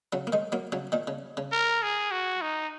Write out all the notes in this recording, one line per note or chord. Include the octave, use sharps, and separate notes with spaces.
C#3 F#3
A#3
D#3 G#3
F#3 A#3
C#3 F#3
A#2 D#3
C#3
C#3
A#4
G#4
F#4
D#4